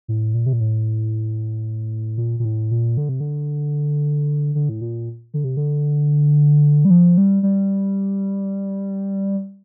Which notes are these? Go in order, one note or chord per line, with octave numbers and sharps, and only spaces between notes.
A2
A#2
C3
A#2
A2
A#2
A#2
A2
A#2
D3
C3
D3
D3
A2
A#2
D3
C3
D3
G3
F3
G3
G3